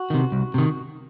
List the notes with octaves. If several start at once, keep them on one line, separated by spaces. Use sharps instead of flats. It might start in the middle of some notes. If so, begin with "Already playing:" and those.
Already playing: F#4
C3 D#3
C2
C3 D#3